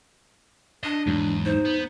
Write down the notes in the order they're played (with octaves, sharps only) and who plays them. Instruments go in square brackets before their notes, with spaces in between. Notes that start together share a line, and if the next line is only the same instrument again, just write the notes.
[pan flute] D4 [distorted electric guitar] D#5
[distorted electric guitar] E2 [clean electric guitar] G#2 F#3
[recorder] D#4 [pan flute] C5
[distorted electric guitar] B3